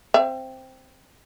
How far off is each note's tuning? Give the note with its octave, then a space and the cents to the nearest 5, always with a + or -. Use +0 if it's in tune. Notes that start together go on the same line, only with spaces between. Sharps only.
C4 +0 E5 +40